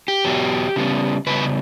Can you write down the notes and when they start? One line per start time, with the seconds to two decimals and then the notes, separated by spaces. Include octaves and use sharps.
0.08 G4
0.24 E2 B2 F#3 B3
0.76 C#3 G3 B3
1.27 C#3 G3 B3 B4